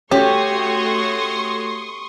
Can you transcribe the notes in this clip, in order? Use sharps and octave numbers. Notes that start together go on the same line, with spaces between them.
A3 C#4 F#4 G4 C#5 C6 C#6 D#6